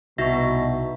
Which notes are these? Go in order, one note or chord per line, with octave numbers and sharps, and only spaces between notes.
C2 B2 D#4 F#4 E5 C#6 A#6